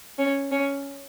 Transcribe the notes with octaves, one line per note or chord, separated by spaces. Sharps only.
C#4
C#4